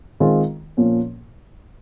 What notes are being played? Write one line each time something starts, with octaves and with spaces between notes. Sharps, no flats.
D#3 G#3 C4 F4 G#4
A#2 F3 A#3 C#4